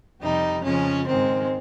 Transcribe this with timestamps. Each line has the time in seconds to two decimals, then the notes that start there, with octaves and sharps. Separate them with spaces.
0.20 F2 C3 G3 D#4
0.63 F2 C#3 F3 G#3 C#4
1.07 G#2 D#3 G#3 C4